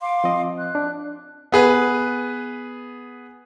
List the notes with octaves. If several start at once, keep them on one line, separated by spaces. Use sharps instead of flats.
F5 C6 D6
F3 C4 D#5
F#6
D4
B3 G#4 B4